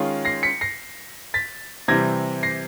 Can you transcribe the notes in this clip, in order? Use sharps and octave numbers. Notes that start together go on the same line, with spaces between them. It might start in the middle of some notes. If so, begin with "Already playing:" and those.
Already playing: D#3 G#3 C#4 F4
A#6 C7
B6 C#7
A#6 C7
A6 B6
C3 E3 G3 G#6 A#6
A#6 C7